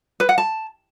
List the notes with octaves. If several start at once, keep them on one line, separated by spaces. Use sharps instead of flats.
B4
F#5
A5